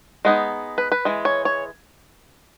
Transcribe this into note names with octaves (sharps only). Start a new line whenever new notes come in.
G#3 B3 D#4
B4
B4
E3 G#3
C#5
C#5